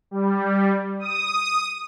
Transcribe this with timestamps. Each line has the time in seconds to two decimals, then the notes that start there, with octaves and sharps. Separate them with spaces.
0.11 G3
1.00 D#6